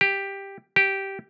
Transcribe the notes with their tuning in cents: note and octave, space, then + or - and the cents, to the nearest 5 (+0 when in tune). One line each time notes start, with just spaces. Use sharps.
G4 +5
G4 -10